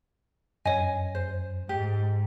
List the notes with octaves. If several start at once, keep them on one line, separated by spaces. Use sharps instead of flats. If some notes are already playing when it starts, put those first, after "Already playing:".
F#2 C#5 D#5 G#5
C5
G#2 G4